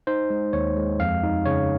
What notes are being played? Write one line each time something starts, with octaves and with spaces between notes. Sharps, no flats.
D#4 C5
G#3
D#2 C#5
G#3
F2 F5
D#4
C#3 C#5